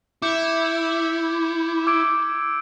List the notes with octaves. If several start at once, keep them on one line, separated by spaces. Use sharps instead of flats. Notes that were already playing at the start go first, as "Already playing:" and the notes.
E4 D6 G6 C#7
D6 E6 G#6 D7